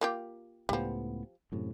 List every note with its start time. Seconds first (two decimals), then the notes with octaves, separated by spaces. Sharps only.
0.01 A#3 F4 G4
0.69 C#2 A2 F3 G3 B3
1.52 F#2 A2 C3